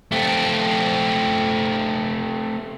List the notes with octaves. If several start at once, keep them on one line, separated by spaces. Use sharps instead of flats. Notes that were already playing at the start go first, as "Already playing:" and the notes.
A3 C4